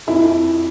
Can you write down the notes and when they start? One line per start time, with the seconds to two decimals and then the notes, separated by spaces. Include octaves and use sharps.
0.07 F2 E4